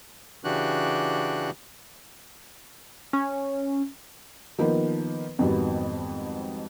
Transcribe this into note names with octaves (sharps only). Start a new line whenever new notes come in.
C#3 E3 D4 F#4 G4 F#6
C#4
D#3 F3 A#3 B3 D#4 B4
F2 G#2 D#3 F#3 G3 B3